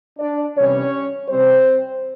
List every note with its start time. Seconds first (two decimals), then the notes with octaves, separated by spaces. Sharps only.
0.19 D4 D5
0.55 C3 E3 G3 C#4 C#5
1.28 C3 E3 G3 C4 C5